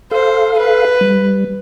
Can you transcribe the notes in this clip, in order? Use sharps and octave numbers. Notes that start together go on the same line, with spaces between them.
A4 C5 F5
B4
G3